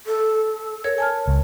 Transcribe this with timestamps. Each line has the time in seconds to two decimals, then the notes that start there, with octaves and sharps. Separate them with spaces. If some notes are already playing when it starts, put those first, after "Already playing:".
0.06 A4
0.84 A#4 C#5 G#6
0.98 G#5 A5 F6
1.28 C#2